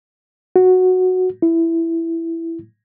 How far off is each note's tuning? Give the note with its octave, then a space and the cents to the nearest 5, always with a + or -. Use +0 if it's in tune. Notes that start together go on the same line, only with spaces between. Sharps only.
F#4 -5
E4 +5